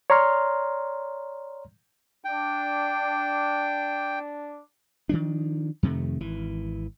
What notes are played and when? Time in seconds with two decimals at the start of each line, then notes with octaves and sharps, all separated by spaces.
0.10 C#5 D5 A#5 C6 F6
2.24 D4 G5
5.09 D#3 F3 D4
5.83 F2 C3 D#3 A3
6.21 G#1 E3